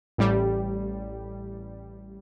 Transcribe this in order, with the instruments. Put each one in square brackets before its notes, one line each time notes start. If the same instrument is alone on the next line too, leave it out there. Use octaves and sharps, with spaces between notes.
[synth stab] A1 G3